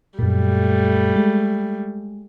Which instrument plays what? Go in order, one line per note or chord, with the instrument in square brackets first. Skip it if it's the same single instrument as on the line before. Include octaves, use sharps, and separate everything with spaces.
[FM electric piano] F#2 A#2 [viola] G3 A3
[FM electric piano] G#3